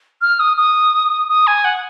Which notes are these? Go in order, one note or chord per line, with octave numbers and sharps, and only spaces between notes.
F6
D#6
D#6
D#6
G#5
F#5